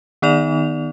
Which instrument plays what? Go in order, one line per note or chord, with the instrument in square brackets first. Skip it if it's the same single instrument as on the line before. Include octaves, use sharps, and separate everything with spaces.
[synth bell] D#3 B3 D#4 D5 F7